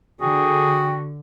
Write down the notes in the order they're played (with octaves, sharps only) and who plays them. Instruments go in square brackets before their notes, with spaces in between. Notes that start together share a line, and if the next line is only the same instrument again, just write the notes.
[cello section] D3 [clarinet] F#4 [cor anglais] G#4 [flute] G5